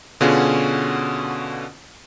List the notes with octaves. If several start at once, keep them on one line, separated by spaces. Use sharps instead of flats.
B2 D3 C#4 F4 F#4 G#4